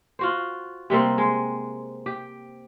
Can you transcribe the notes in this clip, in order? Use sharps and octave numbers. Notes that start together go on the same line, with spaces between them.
F4 F#4 C5
C3 G3 A#3 C4
G#3
G4